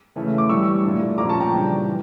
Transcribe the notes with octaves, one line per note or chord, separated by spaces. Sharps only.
C#3 E3 A3 C#4
D6
A2 E3 G3 C#6 E6
A#2 A3 D4
A#2 F3 C#4 A#5 D6
A5 C#6
G5 A#5
C#3 E3 G3 D4
E3